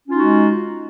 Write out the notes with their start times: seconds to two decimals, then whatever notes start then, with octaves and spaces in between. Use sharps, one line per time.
0.07 C#4
0.10 F4
0.13 D#4
0.15 F#4
0.18 G#3